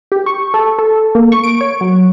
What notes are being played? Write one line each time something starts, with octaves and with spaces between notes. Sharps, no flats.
G4
C#6
A4
A4
A#3
C#6
D7
C#5
F#3